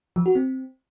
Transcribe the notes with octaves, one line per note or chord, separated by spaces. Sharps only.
F3
F#4
C4